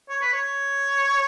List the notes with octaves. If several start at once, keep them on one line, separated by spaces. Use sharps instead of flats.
C#5
B4
C#5